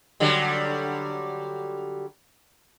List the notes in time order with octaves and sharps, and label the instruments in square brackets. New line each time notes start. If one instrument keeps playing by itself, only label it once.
[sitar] D3 F#3 G3